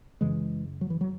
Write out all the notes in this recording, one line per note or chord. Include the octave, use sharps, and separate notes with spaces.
F#2 C#3 E3 G#3
F#3
E3
F#3